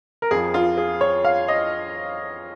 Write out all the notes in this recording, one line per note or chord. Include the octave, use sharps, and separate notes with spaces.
A#4
F2 F3 G#4
F4
G#4
C#5
F5
D#5